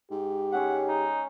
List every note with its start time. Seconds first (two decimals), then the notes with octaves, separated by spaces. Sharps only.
0.11 G#2 G4
0.52 G#3 C#4 E5 F#5
0.88 D#4